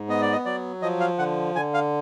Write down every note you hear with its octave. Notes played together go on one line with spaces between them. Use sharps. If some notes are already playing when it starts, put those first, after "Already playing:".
Already playing: G#2
B3 D#5
D5
D#5
F#3 D5
F3 D#5
F5
D3 F#5
D3 G#5
F5